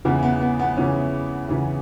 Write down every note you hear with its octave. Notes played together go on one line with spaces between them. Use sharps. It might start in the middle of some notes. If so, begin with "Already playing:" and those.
E2 C#3 E3 B3
B3
B3
B3
E2 C#3 E3 C#4
E2 C#3 E3